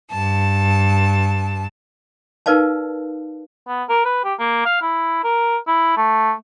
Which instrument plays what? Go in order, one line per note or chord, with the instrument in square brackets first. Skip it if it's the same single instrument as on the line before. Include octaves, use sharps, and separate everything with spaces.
[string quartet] G2 A5
[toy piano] D#4 A#4 B4 D5 F5 A5
[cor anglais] B3
A#4
B4
G4
A#3
F5
E4
A#4
E4
A3